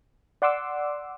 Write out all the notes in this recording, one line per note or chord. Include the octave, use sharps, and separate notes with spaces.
D5 F#5 C6 D6 E6